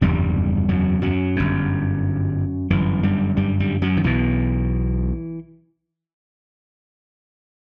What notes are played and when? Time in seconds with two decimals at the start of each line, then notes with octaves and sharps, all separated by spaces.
0.01 F#1 E2 G2 C3 G3
0.69 F#2 F#3
1.02 F#2 F#3
1.36 G1 G2
2.70 G1 F#2 E3
3.03 G2 G3
3.37 G2 G3
3.60 G2 G3
3.82 F#2 F#3
3.97 D#3
4.04 B1 B2 E3